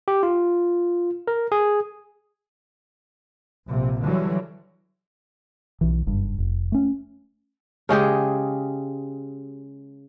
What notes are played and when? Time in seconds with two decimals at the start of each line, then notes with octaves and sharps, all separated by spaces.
0.08 G4
0.23 F4
1.28 A#4
1.52 G#4
3.69 A#1 C3
4.04 D3 E3 F#3 G3
5.81 B1 E3
6.07 F#1 G2
6.38 F1
6.72 A3 C#4
7.89 C#3 G#3 G4 G#4